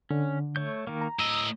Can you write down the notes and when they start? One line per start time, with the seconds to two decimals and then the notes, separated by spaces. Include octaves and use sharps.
0.11 D3 C#4
0.56 A3 C#5 G6
0.87 D#3 A#3
1.01 A#5
1.19 A2 D#5 E6